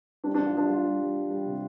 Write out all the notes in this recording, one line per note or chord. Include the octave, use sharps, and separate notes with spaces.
G3 D4
G3 D4
F4
G3 D4
G3 F4
G3
G3
G3
G3
C3